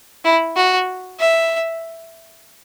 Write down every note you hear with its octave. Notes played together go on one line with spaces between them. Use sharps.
E4
F#4
E5